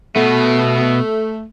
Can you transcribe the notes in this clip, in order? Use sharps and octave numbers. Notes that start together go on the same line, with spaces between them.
B2 A3 B3